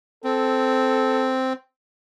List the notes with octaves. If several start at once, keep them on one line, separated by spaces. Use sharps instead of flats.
C4 A4